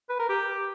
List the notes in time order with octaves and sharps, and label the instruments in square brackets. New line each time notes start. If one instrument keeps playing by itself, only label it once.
[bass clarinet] B4
A#4
G4